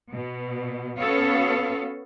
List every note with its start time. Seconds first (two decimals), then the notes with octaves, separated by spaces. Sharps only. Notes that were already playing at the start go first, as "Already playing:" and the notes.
0.12 B2
0.99 B3 C#4 F#4 A4 C#5 F5